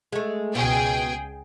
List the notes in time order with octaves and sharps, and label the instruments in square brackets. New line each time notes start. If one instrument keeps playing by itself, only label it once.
[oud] G#3 A3
[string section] C#2 G#4 G5 [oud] B2